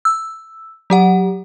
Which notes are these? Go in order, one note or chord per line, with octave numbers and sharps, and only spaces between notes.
E6
F#3 G4 F#5